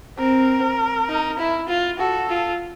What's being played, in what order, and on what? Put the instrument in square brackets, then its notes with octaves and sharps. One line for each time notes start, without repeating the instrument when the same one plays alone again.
[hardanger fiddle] C4 [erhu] A#4
[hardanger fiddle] D#4
E4
F4
[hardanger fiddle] F#4 [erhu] A4
[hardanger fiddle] F4